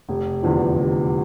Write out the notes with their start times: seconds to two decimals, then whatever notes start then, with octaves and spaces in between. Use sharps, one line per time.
0.09 F1
0.43 E2 D3 F3
0.78 F1